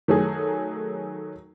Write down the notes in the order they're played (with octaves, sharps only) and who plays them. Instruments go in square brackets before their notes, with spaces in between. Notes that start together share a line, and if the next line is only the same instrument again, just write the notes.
[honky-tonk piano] D#3 F#3 A3 G#4